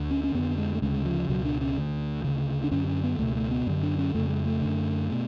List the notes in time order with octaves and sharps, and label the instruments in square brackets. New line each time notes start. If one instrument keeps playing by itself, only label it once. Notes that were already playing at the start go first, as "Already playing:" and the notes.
Already playing: [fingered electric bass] D2 D3
C#4
C#4
F2 D3 B3
G#3
A3
D2 C#3 G#3
F3
C#2 B2 F#3
D4
C#4
D2 D3
D2 C#3
D4
F#2 D3 C#4
C#4
B3
C#2 B2 A3
A3
B3
F#2 D3
D4
C#4
F2 C#3 A3
G#3
A3
F#2 D3
B2